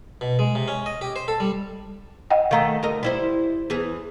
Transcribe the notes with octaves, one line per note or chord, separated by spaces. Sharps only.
B2
G#3
C3
C#4
D#5
G4
C5
A4
G3
D#5 F#5 G5
D#3 A3 D#5 F5 F#5 A#5
D2 A#4 D#5
G3 E4 C5
E2 E3 G#4